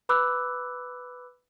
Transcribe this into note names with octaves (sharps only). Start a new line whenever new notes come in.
B4 B5 D6 E6 F#6